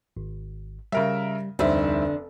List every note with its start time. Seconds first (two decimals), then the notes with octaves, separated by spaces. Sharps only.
0.17 G#1
0.92 C#3 G3 A#4 E5
1.59 F1 D2 D3 G3 C4 D#4 E5